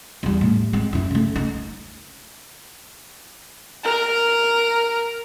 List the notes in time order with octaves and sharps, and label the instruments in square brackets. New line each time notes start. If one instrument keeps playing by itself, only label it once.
[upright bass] E2 G3
A2
G#3 C4
F#2 E4
C#3 A3
D#4
[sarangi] A#4